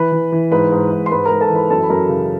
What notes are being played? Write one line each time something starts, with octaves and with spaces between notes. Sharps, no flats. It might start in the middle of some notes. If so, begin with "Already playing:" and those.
Already playing: E3 B4 B5
E3
E3
G#2 B4 B5
G#2
G#2
C6
G#2 B4 B5
A#4 A#5
G#2
A4 A5
E3
B4 B5
F#2 A4 A5
B5
F#2 A#4 A#5
C#3